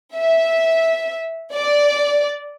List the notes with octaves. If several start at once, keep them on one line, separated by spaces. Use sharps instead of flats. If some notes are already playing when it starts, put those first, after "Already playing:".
E5
D5